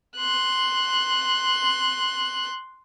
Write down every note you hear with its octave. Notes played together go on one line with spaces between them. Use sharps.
C6 F#6